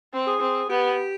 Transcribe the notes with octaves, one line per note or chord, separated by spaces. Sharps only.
C4
G#4
C4
B3 G4